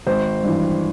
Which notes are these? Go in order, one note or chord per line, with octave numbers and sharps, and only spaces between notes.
G#1 C5
G2 E3